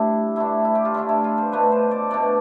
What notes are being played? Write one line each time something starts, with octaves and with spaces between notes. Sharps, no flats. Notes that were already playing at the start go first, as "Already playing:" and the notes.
Already playing: A2 G3 D4 E4
D3 A3 D4 E4
E4
G4
F4
D3 A3 D4 E4
E4
F4
C5
B2 A3 D4 B4
C5
D5
B2 A3 D4 D5